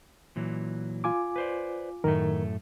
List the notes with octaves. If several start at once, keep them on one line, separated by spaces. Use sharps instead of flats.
A#2 E3 F#3
F4 G#5 D6
B4 C5 D5
F#2 A2 D#3 A3 A#4